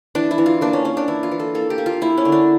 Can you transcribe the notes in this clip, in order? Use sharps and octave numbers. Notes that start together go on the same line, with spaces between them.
E3 D4
E4
E3
F4
A#3 D4
C#4
A#3 C#4
D4
E3 E4
F4
E3
A4
A#3 A4
G4
A#3
F4
A#3 E4
C#4
D3
D4